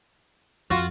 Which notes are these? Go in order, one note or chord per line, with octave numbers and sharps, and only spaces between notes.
F2 F4 F#4